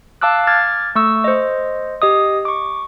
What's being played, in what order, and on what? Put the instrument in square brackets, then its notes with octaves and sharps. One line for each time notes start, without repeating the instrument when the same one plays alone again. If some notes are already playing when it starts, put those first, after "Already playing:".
[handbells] F5 A5 D6 E6 F#6
D6 F6 G#6 A6
A3 C#6 E6
C5 D#5
G4 D#5 D#6
C#6 D6